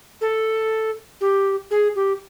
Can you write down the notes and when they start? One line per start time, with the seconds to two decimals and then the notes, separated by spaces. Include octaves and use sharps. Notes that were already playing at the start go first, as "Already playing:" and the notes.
0.21 A4
1.21 G4
1.71 G#4
1.95 G4